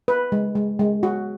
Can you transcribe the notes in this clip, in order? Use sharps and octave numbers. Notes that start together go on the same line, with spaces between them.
B4
G#3
G#3
G#3
F#4